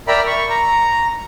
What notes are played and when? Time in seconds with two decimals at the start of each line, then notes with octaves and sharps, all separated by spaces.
0.08 A#4 D5 E5 G5 A#5 B5
0.27 C#6
0.50 A#5